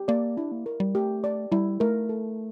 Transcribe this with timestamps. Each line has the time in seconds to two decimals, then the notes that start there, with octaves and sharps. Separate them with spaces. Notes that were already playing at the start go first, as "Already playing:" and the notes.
Already playing: G4
0.08 A#3 D5
0.37 D4 E4
0.52 A#3
0.66 A#4
0.80 G3
0.95 A3 G4
1.24 D5
1.52 G3 E4
1.80 A3 A#4
2.09 A4